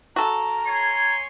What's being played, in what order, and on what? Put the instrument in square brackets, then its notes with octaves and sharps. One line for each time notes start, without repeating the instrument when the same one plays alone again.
[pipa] F#4 A4 [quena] A#5
[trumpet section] C#5 G#5 C6